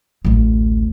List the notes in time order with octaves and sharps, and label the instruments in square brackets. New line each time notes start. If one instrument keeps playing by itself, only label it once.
[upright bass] A1 D2